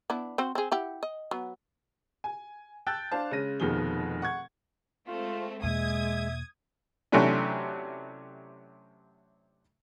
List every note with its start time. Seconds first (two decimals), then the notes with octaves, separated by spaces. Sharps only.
0.10 B3 D4 E4
0.38 C4 F#4 C5
0.55 C4 G#4
0.72 E4 G4 F#5
1.03 D#5
1.31 F#3 B3
2.24 G#5
2.87 G5 A5 E6 F#6 G6 A6
3.12 D4 C5 F5 A5
3.31 C#3 G#3 C#4 A#6 D#7
3.60 F1 B2 D#3 F3 G#4 G7
4.22 F#5 C#6 G#6
5.07 G#3 A3 C4 F4
5.63 E2 B2 G#3 A#3 E5 D#6 G#6
7.12 C3 E3 F#3 A3 C#4 D4